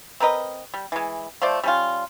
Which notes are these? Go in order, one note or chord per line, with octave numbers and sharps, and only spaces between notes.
C4 A#4 B4 D#5
G3
E3 G#3
F3 A3 C5 D5
G3 C#4 F4